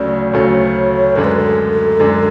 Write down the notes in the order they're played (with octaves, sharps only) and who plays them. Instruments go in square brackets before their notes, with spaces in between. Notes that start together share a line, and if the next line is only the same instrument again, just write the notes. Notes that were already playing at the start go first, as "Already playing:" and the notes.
Already playing: [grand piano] D2 C#3 F#3 A3 [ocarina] D5
[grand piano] D2 C#3 F#3 A3 [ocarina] C#5
[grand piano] F#2 D3 G#3 D4 [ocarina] A4
[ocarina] B4
A4
[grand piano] F#2 D3 G#3 D4